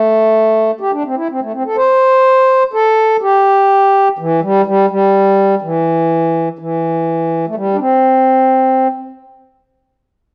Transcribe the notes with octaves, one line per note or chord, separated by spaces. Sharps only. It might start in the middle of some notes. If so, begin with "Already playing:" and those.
Already playing: A3
G4
D4
C4
E4
C4
A3
C4
A4
C5
A4
G4
E3
G3
G3
G3
E3
E3
A3
G3
D4
C4